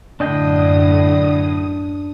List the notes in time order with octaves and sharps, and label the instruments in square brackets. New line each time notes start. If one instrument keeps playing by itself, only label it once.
[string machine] F#2 D#6 [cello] A2 [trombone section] D3 [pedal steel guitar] D4 D#5 G5